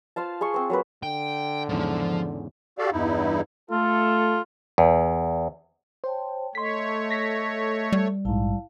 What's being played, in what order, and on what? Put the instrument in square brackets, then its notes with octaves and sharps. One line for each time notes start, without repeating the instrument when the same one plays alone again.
[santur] F4 C5 F5 A5
G#4 C6 C#6
C4 C5
F#3 A#3 B4
[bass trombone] D3 [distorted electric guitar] G5
[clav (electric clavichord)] E2 G#2 C#3 [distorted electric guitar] F3
[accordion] F#4 G4 A4 D5 F5
E2 G2 D#4 E4
[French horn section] A3 [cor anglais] F4 [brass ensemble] A4
[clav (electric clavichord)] E2
[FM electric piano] C5 [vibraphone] C#5 G5 A5
[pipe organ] A3 C#5 [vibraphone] A4 D#5 [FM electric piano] C6 B6
[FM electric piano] A#6 B6
[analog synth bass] G3
[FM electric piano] A#1 G#2 [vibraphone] E4 F5 A5